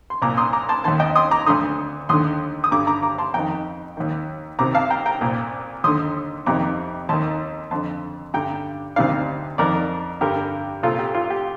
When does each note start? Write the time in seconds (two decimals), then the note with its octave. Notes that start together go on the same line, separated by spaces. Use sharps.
0.10 C6
0.22 C2 A#2 A#5 D6
0.37 C6 D#6
0.53 A#5 D6
0.69 A5 C6
0.84 D#2 D#3 A5 C6
1.00 D#5 G5
1.16 C6 D#6
1.31 A#5 D6
1.46 D2 D3 C6 D#6
2.09 D#2 D3 C6 D#6
2.64 D#6
2.71 G2 D3 A#5 D6
2.87 A#5 D6
3.03 A#5 D6
3.18 A5 C6
3.34 F2 D#3 G5 A#5
3.97 D#2 D#3
4.59 C2 C3 D#3 A#5 D6
4.74 F5 A5
4.90 G5 A#5
5.06 G5 A#5
5.21 C2 A#2
5.84 D#2 D3 C6 D#6
6.46 F2 C3 D#3 A#5 D6
7.09 D#2 D#3 A5 C6
7.71 F2 D3 A5 C6
8.34 G2 D3 G5 A#5
8.96 D2 C3 D#3 D5 F5
9.58 F2 D#3 A#4 D5
10.21 G2 D3 G4 A#4
10.83 C2 A#2 F4 A4
10.99 G4
11.15 F4
11.30 G4